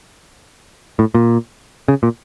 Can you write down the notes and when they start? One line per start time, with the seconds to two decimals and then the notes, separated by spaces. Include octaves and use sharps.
0.99 A2
1.14 A#2
1.88 C#3
2.03 A#2